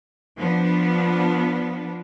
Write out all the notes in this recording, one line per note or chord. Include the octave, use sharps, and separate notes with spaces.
F3 B3 D4